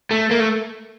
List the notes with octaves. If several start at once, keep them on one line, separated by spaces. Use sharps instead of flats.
A3
A#3
A3